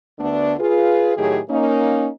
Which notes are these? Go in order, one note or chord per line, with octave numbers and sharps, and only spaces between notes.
D2 D3 A3 B3 D4
F4 G#4 B4
A2 D#3 F#3 G4 G#4
A#3 C#4 D#4